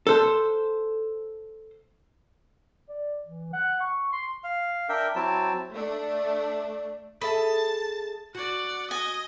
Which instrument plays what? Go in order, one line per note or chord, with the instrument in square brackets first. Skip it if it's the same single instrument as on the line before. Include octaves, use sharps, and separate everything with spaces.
[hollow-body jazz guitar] A4 C5
[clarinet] D5
E3
F#5
C#6
C6
[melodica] F5
D4 A#4 E5 G5
F#3 C4 E4 A5
[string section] A3 D4
[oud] G#4 A4 E5 [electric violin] A5 [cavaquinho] B5
[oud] F#4 [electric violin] D5 F#5
[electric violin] D#5 [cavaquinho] G#5